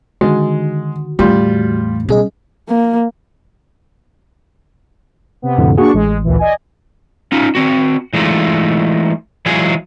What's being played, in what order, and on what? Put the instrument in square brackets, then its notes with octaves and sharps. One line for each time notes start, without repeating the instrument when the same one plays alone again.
[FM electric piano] D3 D#3 F#4 [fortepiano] G#3
[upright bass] E2 A2 [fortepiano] G3 F4
[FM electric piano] B2 G#4 D#5 [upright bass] G3 C#4
[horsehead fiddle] A#3
[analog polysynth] C3 B3
[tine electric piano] F2 A2 D3
[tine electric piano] A#3 F#4 G#4 [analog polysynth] D4 C#6
[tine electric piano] A1 [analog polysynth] G#3
[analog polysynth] D2 A#2 E3
D5 D#5 G#5
[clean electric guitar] C#4 D#4 F4
C4 F#4
E3 G#3 A3 D#4 F4
E3 F#3 G#3 F4 G#4 G#5